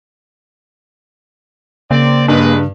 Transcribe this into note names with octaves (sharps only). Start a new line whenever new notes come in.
C#3 A#3 C4 D5
G2 G3 G#3 B4